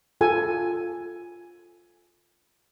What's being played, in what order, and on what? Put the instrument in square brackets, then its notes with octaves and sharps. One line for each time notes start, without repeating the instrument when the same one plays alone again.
[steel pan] F4 A4 G#5